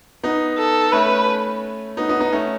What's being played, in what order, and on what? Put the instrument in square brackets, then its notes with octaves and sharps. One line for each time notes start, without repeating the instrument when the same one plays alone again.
[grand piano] B3 D#4
[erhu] A4
[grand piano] A3 C#4 [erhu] B4
[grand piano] B3 D#4
B3 D#4
B3 D#4
A3 C#4